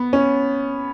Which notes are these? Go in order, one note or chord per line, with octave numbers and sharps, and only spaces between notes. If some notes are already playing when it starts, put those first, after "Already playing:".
Already playing: B3
C#4